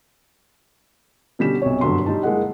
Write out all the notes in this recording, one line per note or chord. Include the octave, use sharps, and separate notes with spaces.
B2 D3 G3 C#4 B6 E7
B1 C3 C#5
F#1 G2 D3 F#3 C6
G3 D#4 A5
G#3 A#3 E4 G#4 D#5 F#5